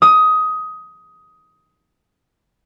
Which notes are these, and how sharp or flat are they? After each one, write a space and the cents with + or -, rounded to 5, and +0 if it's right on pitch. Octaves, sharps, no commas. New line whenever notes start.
D#6 +15